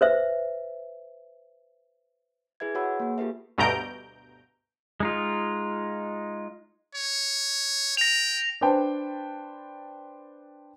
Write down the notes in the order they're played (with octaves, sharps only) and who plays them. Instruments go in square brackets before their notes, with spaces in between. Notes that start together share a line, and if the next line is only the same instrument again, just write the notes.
[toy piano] B4 C5 E5
[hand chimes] E4 G#4 B4 E5 G#6
F#4 B4 C#5 F#5 B5 E6
A#3 G#4
F4 G4 A4 B4 E5
[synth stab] D2 G2 B2 A#5 G6 D7
[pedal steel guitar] G#3 D#4 F4
[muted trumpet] C#5
[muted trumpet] G5 [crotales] A#6 F7
[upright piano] D4 B4 C5 G5 A5